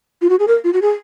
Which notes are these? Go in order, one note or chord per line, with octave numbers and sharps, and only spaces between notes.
F4
F#4
G#4
A#4
F4
F#4
G#4